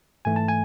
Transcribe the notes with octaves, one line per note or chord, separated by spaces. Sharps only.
G#2 E3 A3 G#5
A5
G#5